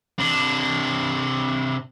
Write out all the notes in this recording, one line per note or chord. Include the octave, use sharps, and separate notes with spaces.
C3 D4